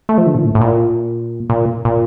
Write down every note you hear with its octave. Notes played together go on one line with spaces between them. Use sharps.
A3
F3
D3
A#2
A2
A2
A#2
A#2
A#2